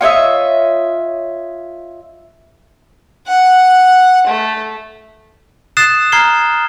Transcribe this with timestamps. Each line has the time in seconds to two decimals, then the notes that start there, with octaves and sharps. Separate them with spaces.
0.01 F4 C#5 D#5 E5
3.27 F#5
4.27 A3
5.77 D#6 F#6 A6 C7 E7
6.12 A#5 F6 G#6 C7 G7